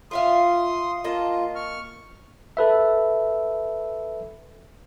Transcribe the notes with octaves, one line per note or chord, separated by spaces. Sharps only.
F4 E5 F5 C6 D#6
A#3 F4 D#5 A5
C#6 F6
A4 B4 E5